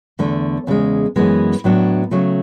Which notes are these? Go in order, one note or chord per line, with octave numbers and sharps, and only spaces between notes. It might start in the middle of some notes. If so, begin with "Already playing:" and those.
E2 D3 A3
E2 C#3 G#3
F#2 E3 G#3 B3
A2 F#3 B3 D4
C#3 F#3 A3